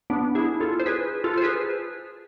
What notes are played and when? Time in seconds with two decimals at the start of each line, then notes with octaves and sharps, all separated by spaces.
0.10 B3 D4
0.35 E4 G#4
0.60 F4 A4
0.80 C5
0.86 G#4 B4
1.24 F4 A4
1.37 C5
1.42 G#4 B4